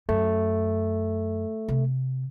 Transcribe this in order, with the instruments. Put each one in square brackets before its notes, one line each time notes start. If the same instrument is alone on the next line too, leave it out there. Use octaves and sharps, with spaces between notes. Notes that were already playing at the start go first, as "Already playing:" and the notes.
[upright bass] F#2 [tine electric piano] A3
[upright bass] C3